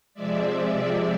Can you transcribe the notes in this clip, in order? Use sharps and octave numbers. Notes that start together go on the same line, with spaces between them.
C3 F3 G#3 D5 E5